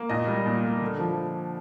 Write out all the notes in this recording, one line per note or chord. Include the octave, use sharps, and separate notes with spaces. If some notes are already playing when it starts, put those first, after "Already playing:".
Already playing: A#3
A#2 D#5
G3
A#2
A#3
D3
F3